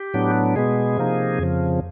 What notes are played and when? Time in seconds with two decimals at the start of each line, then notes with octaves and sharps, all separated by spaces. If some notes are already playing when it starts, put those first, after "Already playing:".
Already playing: G4
0.14 A2 F#3 B3 D4
0.56 B2 G#3 B3 G#4
0.97 C3 F3 A#3 D#4
1.38 F2 C#3 F3